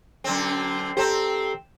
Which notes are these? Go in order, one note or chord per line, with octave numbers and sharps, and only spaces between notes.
F#2 D3 C4
C4 G4 A4 C5 A#5